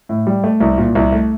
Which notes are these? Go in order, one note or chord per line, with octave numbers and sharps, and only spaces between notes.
A2
G3
A3
C2
A#2
C2
A3